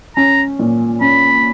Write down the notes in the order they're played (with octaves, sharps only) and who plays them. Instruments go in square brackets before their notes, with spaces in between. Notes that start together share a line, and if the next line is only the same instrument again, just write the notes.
[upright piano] C#4 [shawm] A#5
[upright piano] A#2
[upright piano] C#4 [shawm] B5